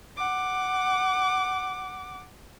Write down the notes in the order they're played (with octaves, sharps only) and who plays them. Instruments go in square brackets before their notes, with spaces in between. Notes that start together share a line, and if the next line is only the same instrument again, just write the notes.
[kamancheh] F#5 D6